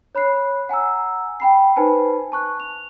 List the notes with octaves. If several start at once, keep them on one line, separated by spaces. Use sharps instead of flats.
C#5 B5 F#6 C7
F#5 G#5 A#5 E6
G5 B5 C7
D#4 B4 C5 G#5 A5 B5
A5 C#6 F#6
F7